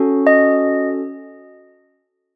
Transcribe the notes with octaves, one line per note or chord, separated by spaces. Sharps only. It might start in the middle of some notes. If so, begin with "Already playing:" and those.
Already playing: C#4 F#4 A4
D#5